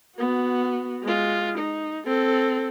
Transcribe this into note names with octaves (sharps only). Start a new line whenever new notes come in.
B3 F#4
G#3 F4
D#4
C4 A4